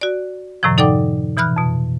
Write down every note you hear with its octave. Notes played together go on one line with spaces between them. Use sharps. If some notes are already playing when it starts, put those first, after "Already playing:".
F#4 D5
F#2 A2 C3 D#3 F3
D#4 A4 D5 F#5 G5 D6
B2 E3 B5 F6 F#6
F2 B2